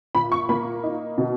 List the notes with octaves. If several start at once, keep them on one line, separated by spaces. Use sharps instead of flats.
A#2 B5
C#6
A#3 B5
D#4
B2